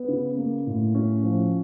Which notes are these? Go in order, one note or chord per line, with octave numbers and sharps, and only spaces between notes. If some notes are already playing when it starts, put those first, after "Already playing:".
Already playing: B3
C#3
A#3
A2
C#4
F3